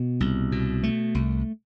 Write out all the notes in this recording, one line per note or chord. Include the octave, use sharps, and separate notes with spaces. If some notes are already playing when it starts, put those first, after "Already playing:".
Already playing: B2
C2
B2
A3
C2